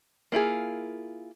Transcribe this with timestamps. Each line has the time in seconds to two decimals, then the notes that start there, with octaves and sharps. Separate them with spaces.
0.32 A#3 E4 F4 G#4